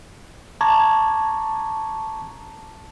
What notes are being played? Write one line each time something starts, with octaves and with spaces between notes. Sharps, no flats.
A5 A#5 C#6 D6 G#6